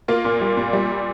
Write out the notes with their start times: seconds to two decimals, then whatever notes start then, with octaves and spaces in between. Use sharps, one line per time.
0.08 A#3 F4
0.25 A#2
0.41 G3
0.57 A#2
0.73 G3